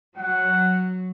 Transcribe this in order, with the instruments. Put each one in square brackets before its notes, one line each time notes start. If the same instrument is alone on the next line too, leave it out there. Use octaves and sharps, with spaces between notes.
[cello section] F#3 [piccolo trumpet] F#5